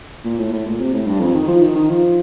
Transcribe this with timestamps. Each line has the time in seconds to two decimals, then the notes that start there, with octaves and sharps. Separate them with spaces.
0.25 A#2
0.39 A2
0.53 A2
0.66 A#2
0.80 C3
0.94 A2
1.07 G2
1.21 F2
1.35 D#3
1.48 F3
1.62 D#3
1.75 D#3
1.90 F3